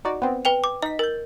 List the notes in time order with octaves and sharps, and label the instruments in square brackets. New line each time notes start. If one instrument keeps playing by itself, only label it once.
[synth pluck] D#4 F#4 D5
B3 C4
[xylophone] B4 G5 F7
D6
[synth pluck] D#4 B6 [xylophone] D#5
[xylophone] A#4 [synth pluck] G6 A6